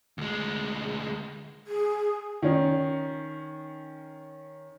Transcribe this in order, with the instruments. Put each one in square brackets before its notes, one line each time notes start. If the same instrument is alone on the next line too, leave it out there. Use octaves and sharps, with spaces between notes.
[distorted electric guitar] D2 G#3
[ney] G#4
[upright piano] D#3 C#4 D#4